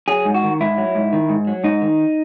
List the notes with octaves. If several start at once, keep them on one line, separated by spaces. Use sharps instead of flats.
F#3 G#4
G#2
F#4
D#3
G#2 E4
F#3
G#2
D#3
G#2
F#3
G#2 D#4
D#3